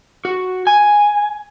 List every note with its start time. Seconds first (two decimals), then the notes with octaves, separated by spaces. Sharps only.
0.25 F#4
0.67 G#5